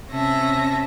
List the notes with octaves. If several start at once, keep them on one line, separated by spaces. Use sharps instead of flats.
C3 C#4 E5 A5 A#6